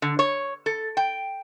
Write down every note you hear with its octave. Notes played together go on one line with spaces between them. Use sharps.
D3
C#5
A4
G5